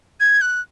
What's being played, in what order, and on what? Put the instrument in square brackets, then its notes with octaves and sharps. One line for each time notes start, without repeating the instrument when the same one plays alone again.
[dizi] G#6
F#6